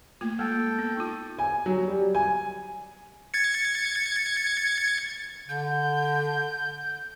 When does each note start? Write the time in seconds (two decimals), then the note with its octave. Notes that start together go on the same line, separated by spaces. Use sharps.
0.21 A3 A#3 F4
0.39 G#3 A#3 A4 G5
0.79 B3
0.97 D#4 F4
1.39 G#5
1.66 F#3
1.88 G3
2.15 G#5
3.34 G#6 A6 C#7
5.49 D3 G6